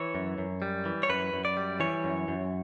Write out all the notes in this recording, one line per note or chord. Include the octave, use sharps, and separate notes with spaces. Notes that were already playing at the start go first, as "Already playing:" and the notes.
Already playing: E3 C#5
F#2
F#2
G3
E3
C#5
F#2 B4
F#2
D5
G3
E3 C#5
F#2
F#2